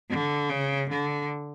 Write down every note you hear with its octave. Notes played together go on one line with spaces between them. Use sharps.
D3
C#3
D3